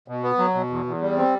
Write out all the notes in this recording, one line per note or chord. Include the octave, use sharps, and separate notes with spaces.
B2
B3
F#3
B2
E2
E2
G3
C4